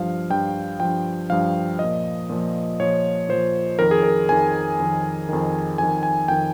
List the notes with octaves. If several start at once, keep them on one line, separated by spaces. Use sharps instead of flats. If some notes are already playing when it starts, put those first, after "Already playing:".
Already playing: G2 F3 F5
G2 F3 G5
G2 F3 G5
G2 F3 F5
A#2 F3 D#5
A#2 F3
A#2 F3 C#5
A#2 F3 C5
F2 D#3 A#4
G#4
A#4
F2 D#3 G#5
F2 D#3
F2 D#3
F2 D#3 G#5
G#5
F2 D#3 G5